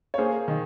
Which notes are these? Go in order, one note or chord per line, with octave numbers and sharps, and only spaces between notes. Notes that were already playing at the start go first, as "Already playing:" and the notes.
C#5
A#3 G#4 C5
D#3